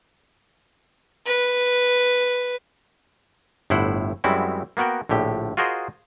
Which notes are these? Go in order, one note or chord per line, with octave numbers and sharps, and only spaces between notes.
B4
G1 A2 E4 C5 F#5
F#2 G3 G#3 C4 E4 F#4
A#3 B3 F#4 A#4 G5
A#1 A2 D3 G4
F4 F#4 G#4 A#4 C5 D#5